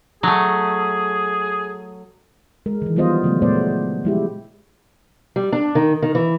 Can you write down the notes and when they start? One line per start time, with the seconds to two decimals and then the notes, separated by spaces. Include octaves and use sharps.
0.23 F#3 A3 G#4
2.66 G#3 A#4
2.82 D#3 E3
2.96 F3 G3 B3 F4 C5 D#5
3.23 C#3 F#3 G#3 A3 B3
3.42 A#2 G#3 A3 B3 C5 D5
4.03 F3 G#3 E4 G4
5.36 G3
5.52 D4
5.75 D#3
6.02 D#3
6.15 E3